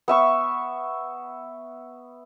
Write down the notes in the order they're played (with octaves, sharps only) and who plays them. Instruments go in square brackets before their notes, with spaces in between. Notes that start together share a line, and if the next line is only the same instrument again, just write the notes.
[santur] B3 E5 C#6